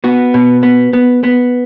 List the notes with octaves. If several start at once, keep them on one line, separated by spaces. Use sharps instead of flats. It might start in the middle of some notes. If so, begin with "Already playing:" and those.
B3 F#4
B2
B3
B3
B3